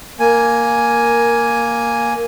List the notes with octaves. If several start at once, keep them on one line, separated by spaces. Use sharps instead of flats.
A#3 G#5